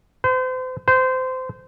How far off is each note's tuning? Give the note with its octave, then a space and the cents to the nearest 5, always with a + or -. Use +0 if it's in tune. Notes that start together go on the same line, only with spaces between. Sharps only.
C5 -35
C5 -20